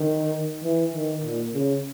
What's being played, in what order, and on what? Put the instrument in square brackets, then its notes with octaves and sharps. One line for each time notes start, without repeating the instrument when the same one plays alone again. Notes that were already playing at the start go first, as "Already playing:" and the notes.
Already playing: [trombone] D#3
E3
D#3
A#2
C#3